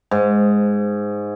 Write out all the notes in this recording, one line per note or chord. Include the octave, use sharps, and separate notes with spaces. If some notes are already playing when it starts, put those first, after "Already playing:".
G#2